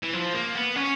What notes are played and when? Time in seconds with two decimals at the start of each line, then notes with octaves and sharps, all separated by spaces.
0.03 E3
0.13 F3
0.34 A#3
0.55 B3
0.76 C#4